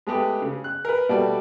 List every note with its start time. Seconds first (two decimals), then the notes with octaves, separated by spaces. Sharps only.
0.07 G#3 A3 B3 G4
0.42 C#3
0.64 F#6
0.85 A#4 B4
1.09 B2 G3 A3 D5